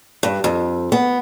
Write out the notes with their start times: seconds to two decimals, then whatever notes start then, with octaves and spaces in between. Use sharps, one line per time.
0.23 G2
0.44 F2
0.92 B3